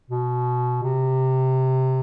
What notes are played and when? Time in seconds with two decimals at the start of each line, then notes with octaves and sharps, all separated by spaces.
0.10 B2
0.83 C3